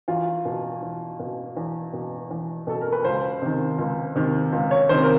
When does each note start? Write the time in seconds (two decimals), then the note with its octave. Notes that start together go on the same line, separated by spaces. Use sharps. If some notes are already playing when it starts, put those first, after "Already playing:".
0.08 E2 F4
0.45 B2
0.82 E2
1.19 B2
1.57 E2
1.93 B2
2.31 E2
2.67 B2 A4
2.81 A#4
2.92 B4
3.04 C#2 C5
3.42 C3 D#3
3.78 C#2
4.16 C3 D#3
4.52 C#2
4.71 C#5
4.89 C3 D#3 C5
5.02 A#4